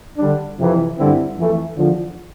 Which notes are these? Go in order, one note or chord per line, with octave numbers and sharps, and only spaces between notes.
D3 G3 D4
F2 C3 E3
G2 D3 G3 C4 E4
F2 E3 A3
E2 D3 F3